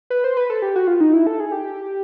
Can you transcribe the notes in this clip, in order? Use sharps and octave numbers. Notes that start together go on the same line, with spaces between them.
B4
C5
B4
A4
G4
F#4
F4
D#4
E4
A4
G#4
G4